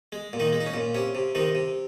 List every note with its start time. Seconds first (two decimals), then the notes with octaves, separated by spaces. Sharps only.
0.12 G#3
0.33 A#2
0.40 D#3 D#4
0.53 G#3
0.61 D#4
0.66 C#4
0.74 A#2
0.95 C3 C#4
1.15 C3
1.35 C3 D#3 D#4
1.55 C3